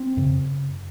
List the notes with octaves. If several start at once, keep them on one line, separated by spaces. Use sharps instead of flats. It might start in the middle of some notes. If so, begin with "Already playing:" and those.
Already playing: C4
F#2 C#3